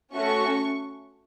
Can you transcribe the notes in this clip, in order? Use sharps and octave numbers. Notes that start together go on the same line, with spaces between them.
A3 C#4 F#4 A4 C#6